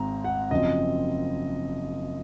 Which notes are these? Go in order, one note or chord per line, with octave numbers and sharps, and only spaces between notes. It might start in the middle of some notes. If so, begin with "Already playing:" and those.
Already playing: G#1 G#2 C4 A#5
F#5
F#1 F#2 F3 C4 D#5